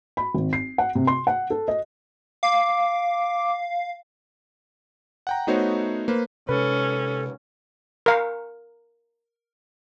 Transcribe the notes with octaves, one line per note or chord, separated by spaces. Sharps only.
B5
G#1
C7
F#5
C3
C6
F#5
A4
D#5
F5 D6
F#5 G5 A#5
A3 B3 D#4 F#4 C5 C#5
A#3 B4 C5
C3 G#3 C#4 A4 B4
A#4 F5